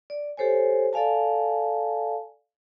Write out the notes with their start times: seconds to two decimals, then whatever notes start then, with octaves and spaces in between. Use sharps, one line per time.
0.10 D5
0.37 G4 A4 C5 C#5 G#5
0.93 A4 D5 F5 G#5 A5